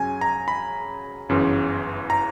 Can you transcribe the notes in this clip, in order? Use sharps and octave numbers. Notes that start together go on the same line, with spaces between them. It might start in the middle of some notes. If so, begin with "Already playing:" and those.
Already playing: F#2 C#3 F#3 G#5
A#5
B5
G1 F#2 C#3 E3
A#5